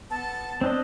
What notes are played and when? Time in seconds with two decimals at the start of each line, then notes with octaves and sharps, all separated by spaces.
0.10 B3 A5
0.61 C4 D4 D#5